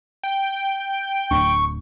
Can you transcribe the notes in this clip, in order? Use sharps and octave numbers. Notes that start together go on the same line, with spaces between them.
G5
D1 D4 C#6